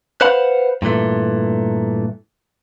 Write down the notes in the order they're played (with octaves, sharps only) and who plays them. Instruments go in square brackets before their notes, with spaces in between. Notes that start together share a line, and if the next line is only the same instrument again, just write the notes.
[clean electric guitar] B4 C5 F5 F#5 B5
G2 A#2 E3 A3